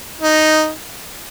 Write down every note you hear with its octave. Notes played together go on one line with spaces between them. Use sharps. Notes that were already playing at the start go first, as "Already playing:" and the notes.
D#4